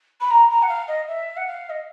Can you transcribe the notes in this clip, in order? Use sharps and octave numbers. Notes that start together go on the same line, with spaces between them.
B5
A#5
A#5
F#5
F5
D#5
E5
F#5
F5
D#5